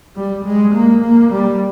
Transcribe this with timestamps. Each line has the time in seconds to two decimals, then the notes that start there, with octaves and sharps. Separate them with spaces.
0.16 G3
0.45 G#3
0.74 A#3
1.03 A#3
1.31 G3